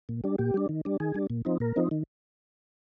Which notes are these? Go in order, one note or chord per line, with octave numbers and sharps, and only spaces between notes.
A#2
G3 D4
A#2 G4
G3 D4
D#3
G3 D4
D#3 G#4
G3 D4
A#2
F3 C4 D#4
A#2 A#4
F3 C4 D#4
D#3